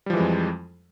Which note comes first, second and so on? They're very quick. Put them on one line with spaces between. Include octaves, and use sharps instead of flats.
G3 F3 E3 G#3 F2